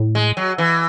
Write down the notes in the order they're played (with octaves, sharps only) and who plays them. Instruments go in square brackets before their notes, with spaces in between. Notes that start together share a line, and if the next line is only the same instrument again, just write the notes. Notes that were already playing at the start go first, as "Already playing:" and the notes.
Already playing: [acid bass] A2
[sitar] G#3
F#3
E3